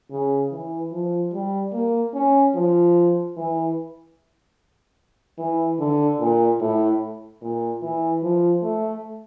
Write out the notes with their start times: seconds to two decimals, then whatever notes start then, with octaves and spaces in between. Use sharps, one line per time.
0.11 C#3
0.51 E3
0.93 F3
1.33 G3
1.73 A#3
2.14 C#4
2.55 F3
3.36 E3
5.38 E3
5.79 D3
6.20 A#2
6.60 A2
7.41 A#2
7.83 E3
8.23 F3
8.63 A3